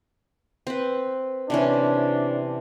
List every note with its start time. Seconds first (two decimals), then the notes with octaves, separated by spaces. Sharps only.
0.67 C4 B4
1.50 C3 E3 C#4 D4